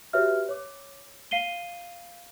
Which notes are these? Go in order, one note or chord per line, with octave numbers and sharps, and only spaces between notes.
F#4 G4 B4 C#5 E5 F6
C#5 D6
F5 C7 D#7 G7